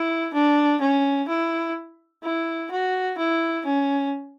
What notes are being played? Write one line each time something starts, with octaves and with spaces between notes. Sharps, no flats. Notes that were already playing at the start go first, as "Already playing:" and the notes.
Already playing: E4
D4
C#4
E4
E4
F#4
E4
C#4